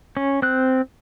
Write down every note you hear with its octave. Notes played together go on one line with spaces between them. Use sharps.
C#4
C4 F#6